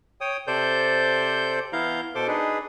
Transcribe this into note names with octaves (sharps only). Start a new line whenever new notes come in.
C#5 G5 D#6
C3 A4 C5 D5 G6
E3 B3 E4 F5 A#5 G6
B2 A4 C5 C6 D6
D4 D#4 G#4 B4